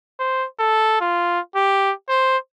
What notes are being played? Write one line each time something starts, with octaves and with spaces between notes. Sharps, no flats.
C5
A4
F4
G4
C5